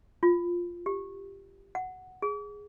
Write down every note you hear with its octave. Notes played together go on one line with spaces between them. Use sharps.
F4
G4
F#5
G#4